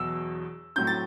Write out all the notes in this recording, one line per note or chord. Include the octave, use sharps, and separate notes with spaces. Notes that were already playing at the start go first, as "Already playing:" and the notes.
Already playing: E2 B2 F#3 E6
A2 F#3 C4 G6
A6